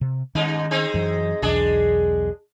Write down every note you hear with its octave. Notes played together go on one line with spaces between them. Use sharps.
C3
G2 D#3 C#4 D#4
G#3 C4 D#4
F#2 E3 F#3
B1 E2 G#3 D4 G#4